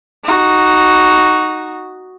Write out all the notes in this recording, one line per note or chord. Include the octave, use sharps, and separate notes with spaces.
D#4 F#4